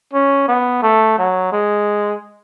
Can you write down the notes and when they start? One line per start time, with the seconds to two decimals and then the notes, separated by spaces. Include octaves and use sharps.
0.13 C#4
0.48 B3
0.83 A3
1.19 F#3
1.52 G#3